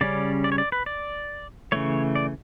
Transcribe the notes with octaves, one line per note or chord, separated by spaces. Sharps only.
C#3 G3 C#4 D5
D5
C#5
D5
B4
D5
C#3 E3 A3 C#5
D5